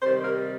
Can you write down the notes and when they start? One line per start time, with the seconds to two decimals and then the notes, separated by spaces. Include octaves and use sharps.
0.02 C3 D#3 G3 C5
0.24 A#4